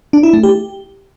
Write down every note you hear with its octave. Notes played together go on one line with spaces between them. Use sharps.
D4
E4
A3
G4